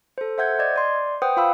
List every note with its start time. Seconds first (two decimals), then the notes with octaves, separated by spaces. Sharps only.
0.18 A4 C5
0.38 C5 E5 F#5 G6 G#6
0.59 D5 D#5 G#6
0.76 D5 C6
1.22 B4 C5 F#5 G5 D#6
1.37 F4 F5 B5 E6